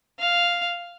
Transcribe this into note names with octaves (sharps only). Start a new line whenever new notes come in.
F5